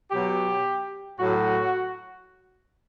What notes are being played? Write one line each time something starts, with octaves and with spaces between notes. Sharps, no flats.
B2 F#3 G4
A2 F#3 F#4